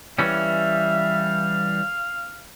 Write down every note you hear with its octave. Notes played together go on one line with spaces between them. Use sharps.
E3 G3 C#4 E5 F5